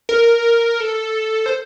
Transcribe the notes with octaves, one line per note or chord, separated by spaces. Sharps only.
A#4
A4
C5